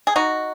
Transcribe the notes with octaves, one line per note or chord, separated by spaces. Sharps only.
G#4
D#4 F#4